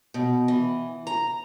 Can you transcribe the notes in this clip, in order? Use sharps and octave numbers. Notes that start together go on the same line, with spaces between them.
B2
E3
A#5